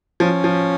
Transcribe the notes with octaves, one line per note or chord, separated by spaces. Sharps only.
F3 C#4
F3